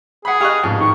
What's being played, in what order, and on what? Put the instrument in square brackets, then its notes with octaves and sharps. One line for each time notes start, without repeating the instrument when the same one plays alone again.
[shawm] G#4 [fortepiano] F#5 B5
[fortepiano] G4 C#6 F#6 [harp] D#5 F5
[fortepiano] A1 F2 [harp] G#2
[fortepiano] D#3 [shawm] C#6